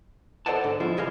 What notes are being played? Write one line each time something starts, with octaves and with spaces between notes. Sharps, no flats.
A4 C5 D5 D#5 F#5 A5
G#2 D3
B2 F3 E4 F4
C2 E3 G#4 D#5 F5